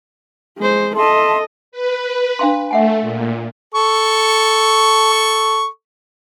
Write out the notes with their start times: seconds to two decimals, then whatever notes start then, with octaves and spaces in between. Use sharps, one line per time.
0.58 G#3 C5
0.96 A4 D#5 E5 A5 C6
1.72 B4
2.39 D4 F5 C6
2.71 A3 E5 F#5 G#5
3.01 A#2
3.75 A4 C#6